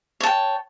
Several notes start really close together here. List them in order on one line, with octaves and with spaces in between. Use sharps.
C#5 A5 G5